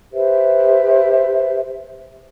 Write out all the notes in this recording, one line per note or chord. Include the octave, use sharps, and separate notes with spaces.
G4 B4 C5 E5